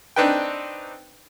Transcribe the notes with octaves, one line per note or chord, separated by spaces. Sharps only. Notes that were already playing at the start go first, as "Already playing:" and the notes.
C4 D4 D#4 B4 G5